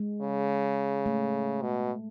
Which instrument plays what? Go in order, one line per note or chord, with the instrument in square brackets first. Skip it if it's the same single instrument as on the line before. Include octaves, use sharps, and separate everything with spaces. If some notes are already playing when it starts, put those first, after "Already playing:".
Already playing: [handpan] G#3
[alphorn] C#3
[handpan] A3
[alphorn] B2